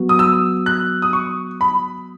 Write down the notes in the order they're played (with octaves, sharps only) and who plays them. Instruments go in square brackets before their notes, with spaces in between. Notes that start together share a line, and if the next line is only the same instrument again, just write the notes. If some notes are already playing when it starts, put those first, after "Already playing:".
Already playing: [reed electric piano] F#3 B3 F#4
[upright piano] D#6
E6
F#6
D#6
C#6
B5